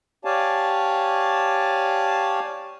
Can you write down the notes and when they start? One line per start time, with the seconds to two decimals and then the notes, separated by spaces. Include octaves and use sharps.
0.25 G4 C#5 D5 F5 G#5 A5